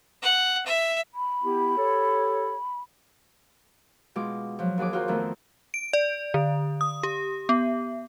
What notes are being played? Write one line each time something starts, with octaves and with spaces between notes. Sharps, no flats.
F#5
E5
B5
B3 E4 G4
G4 A4 C#5
B2 G#3 F4 D6
F3 F#3
D#2 F#4 G#4 D6
F4 F#4 A#4 C5
F2 D#3 A3 B3
D7
D5
D3
D#6
G4
B3